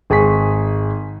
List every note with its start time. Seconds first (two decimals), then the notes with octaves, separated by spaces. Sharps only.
0.10 G#1 G#4 G#5 C#6 B6